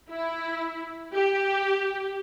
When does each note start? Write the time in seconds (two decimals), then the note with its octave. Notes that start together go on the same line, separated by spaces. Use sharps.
0.11 E4
1.14 G4